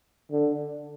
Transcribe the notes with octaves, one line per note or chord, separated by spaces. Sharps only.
D3